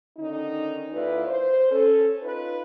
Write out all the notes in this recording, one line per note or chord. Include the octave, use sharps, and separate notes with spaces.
D3 D#3 C#4 D#4
D2 E4 F4 B4 D5
C5
C#4 A4
D#4 F4 B4